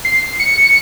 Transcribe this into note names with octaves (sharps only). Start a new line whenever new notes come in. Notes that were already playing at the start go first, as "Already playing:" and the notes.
C7
C#7